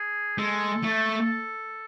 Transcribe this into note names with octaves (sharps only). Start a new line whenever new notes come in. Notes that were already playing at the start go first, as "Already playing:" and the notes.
Already playing: G#4
G#3 A4
A3